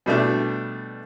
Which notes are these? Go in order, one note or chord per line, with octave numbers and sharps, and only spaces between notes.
B2 G3 A3 D4